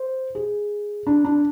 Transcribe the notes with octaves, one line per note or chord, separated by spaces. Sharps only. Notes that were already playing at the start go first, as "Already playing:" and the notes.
Already playing: C5
G#4
D4
D4